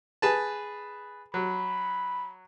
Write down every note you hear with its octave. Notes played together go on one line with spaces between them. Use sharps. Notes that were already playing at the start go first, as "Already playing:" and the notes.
G#4 B4 A5
F#3 B5